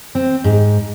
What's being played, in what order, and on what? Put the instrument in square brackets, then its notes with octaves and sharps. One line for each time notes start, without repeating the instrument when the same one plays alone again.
[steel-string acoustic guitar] C4
G#2